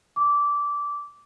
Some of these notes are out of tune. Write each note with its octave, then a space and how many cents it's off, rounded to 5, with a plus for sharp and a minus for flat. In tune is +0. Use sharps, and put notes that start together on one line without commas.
D6 -15